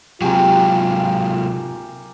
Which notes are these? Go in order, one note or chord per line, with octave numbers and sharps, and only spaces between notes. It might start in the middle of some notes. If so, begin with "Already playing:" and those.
C3 F#3 F4 G4 G#4 A#4